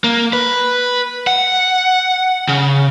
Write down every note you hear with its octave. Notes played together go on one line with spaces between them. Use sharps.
A#3
B4
F#5
C#3